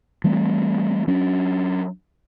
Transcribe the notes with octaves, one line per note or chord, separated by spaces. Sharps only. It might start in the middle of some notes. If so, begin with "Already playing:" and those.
E3 G3 A3 C4
F#3 C#4 D4